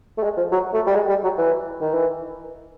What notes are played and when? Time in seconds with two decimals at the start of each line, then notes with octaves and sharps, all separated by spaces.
0.18 A3
0.23 G#3
0.37 F3
0.52 F#3
0.74 A3
0.87 G3
0.95 G#3
1.09 G3
1.24 F#3
1.38 E3
1.81 D#3
1.94 E3